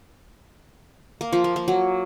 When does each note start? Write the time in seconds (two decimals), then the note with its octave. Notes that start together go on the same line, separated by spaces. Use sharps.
1.21 A#3
1.33 F3
1.44 A#3
1.56 A#3
1.68 F#3